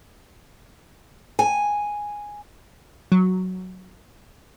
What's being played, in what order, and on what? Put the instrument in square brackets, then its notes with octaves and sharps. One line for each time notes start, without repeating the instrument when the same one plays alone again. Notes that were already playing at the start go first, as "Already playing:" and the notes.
[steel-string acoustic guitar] G#5
[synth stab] F#3